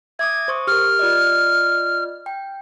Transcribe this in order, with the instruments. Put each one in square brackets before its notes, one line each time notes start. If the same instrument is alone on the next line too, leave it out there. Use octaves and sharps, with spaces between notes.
[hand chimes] E5 D6 D#6 [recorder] G#6
[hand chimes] C5 C#6 D#6
[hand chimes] G4 A#4 [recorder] F6
[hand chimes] F4 D5 D#5
G5